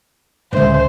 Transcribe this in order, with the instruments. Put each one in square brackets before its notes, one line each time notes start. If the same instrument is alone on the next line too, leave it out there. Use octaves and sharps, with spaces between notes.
[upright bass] C#2 G#3 [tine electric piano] A2 D3 E5 [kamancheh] C5